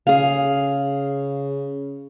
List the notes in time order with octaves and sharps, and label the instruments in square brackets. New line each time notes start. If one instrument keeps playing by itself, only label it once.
[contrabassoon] C#3 [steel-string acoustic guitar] G#4 F5